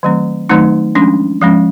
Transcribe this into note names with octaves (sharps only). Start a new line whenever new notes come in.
D#3 F#3 A3 C4
D#3 F#3 A3 C4 D#4
F3 G#3 C#4 D4
F3 G#3 C#4